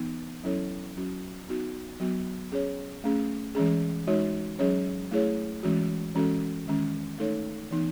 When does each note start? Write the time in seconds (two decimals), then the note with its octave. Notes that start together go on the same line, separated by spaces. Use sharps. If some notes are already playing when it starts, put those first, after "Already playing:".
Already playing: E3 B3 D#4
0.44 F#3 C#4 E4 A4 C#5
0.96 F#3 C#4 F#4
1.48 B3 D#4 F#4
2.00 F#3 B3 F#4
2.52 C#4 G#4 C#5
3.04 A3 C#4 G#4
3.55 E3 G#3 C#4 G#4
4.07 G#3 D#4 F#4 C#5
4.59 F#3 C#4 G#4 C#5
5.11 A3 E4 G#4 C#5
5.63 E3 G#3 C#4 F#4
6.15 E3 G#3 C#4 F#4 A4
6.67 D#3 G#3 C#4
7.18 A3 D#4 A4 C#5
7.71 E3 B3 D#4